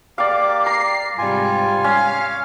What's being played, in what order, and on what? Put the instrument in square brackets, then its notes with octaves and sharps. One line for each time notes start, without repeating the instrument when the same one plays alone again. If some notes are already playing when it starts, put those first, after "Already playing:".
[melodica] A#3 G4 D6 [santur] D5 F5
[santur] A#5 [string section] C7
[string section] G#2 C3 G3 [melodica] F4 G#5
[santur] C#4 [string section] F5